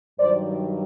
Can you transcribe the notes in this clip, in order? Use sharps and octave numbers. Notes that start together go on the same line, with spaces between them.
G2 D#3 F#3 C5 D5